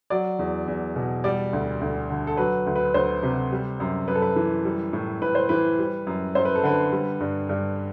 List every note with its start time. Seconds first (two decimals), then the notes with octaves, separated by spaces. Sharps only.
0.10 F#3 D5
0.39 E2
0.68 E2
0.96 B2
1.24 G3 D5
1.53 D2
1.81 D2
2.10 D3
2.27 A4
2.37 F#3 B4
2.66 D2
2.76 B4
2.94 D2 C5
3.23 C3
3.52 G3
3.80 F#2
4.08 F#2 B4
4.15 A4
4.22 B4
4.36 E3
4.65 G3
4.93 A2
5.22 A2 B4
5.35 C5
5.49 E3 B4
5.79 G3
6.07 F#2
6.35 F#2 C5
6.45 B4
6.55 A4
6.64 D3 B4
6.92 G3
7.20 G2
7.49 G2